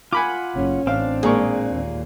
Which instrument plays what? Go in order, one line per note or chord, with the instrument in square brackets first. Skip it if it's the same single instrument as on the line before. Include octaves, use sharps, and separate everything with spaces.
[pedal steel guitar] F4 F#5 [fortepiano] G#5 B5 D6
[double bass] F#1 C#4
[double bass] A1 [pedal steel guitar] C4 D4 [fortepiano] F5
[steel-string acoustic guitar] A#2 [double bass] G#3 [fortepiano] G#4 A#4 C#6
[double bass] D#2